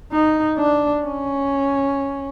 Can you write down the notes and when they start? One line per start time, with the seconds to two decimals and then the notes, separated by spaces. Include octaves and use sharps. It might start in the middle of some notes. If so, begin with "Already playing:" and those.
0.12 D#4
0.58 D4
1.04 C#4